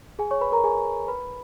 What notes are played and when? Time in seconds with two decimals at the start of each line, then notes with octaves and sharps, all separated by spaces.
0.19 G#4 G#5
0.31 C#5 C#6
0.41 B4 B5
0.52 A#4 A#5
0.64 G#4 G#5
1.08 B4 B5